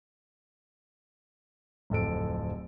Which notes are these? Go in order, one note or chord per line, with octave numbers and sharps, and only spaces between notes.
D1 F2 A4 D7